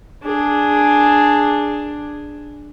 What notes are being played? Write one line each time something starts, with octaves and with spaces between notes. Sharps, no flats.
D4 G#4